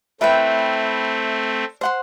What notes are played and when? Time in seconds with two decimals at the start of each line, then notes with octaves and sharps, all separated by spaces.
0.21 A3 C4 E4 B4 E5 G5
1.81 C5 F#5 C6